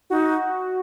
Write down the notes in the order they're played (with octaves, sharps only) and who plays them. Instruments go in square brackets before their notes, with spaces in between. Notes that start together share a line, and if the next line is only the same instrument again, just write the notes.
[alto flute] D#4 [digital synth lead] F#4